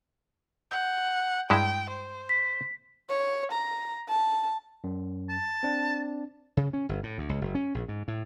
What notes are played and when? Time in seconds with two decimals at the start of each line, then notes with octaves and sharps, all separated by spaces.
0.71 F#5 G6
1.50 G2 G#3 E4 G5
1.90 C5
2.29 B6
3.10 C#5
3.52 A#5
4.09 A5
4.84 F#2
5.29 A5
5.63 C4 D4
6.57 C#3
6.73 C#4
6.89 G1
7.03 A2
7.18 D2
7.29 C#2
7.41 F#1
7.55 C#4
7.74 A#1
7.88 G#2
8.08 A2